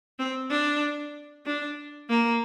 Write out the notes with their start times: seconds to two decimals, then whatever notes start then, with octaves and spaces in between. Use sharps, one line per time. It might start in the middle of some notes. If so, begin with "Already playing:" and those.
0.19 C4
0.51 D4
1.46 D4
2.10 A#3